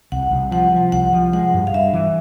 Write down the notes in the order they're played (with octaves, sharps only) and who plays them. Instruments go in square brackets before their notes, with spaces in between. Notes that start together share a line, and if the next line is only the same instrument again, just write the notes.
[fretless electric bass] C2 [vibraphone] F#5
[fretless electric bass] C2
[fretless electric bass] F3 [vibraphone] F#5
[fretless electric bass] F3
[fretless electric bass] C2 [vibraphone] F#5
[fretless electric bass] F3
[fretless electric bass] G#3 [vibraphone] F#5
[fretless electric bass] G2
[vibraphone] F5
[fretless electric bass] G2 [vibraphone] E5
[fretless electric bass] E3